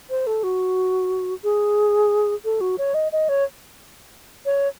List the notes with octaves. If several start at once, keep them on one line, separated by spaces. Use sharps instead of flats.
C5
A4
F#4
G#4
A4
F#4
C#5
D#5
D#5
C#5
C#5